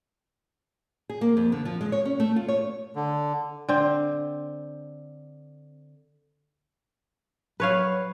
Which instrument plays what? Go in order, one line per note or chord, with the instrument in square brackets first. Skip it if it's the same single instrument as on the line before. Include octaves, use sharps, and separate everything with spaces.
[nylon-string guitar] G#4
A#3
F2
D3
F3
G#3
C#5
C#4
A3
F4
C#5
[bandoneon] D3
[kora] D3 C4
[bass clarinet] F#3 [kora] B4 C#5 F5